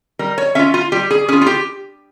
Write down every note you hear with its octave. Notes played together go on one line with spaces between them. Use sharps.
G3 A#4
C#5
C#4 F4 E5
F4
G3 G4
G#4
C#4 F4 G#4
F4
G4